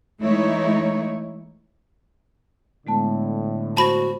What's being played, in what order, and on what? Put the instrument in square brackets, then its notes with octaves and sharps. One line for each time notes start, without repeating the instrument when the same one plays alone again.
[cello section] E3 G#3 A3 D#4 E4 C#5
[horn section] A2 D3 [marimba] G#3 B3 A5
[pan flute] F#4 [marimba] C5 [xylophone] A5 B5